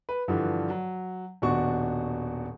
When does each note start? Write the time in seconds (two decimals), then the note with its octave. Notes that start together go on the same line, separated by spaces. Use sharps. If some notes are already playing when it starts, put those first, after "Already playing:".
0.09 B4
0.28 G2 D3 E3 F3
0.70 F#3
1.42 D#1 B2 D4 F#4 C#6